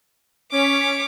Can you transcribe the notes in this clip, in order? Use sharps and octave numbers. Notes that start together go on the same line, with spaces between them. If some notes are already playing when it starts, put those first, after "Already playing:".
C#4 C#5 D6 B6